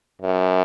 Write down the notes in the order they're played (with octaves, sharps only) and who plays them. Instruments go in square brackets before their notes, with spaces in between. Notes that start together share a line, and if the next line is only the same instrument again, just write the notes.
[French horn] F#2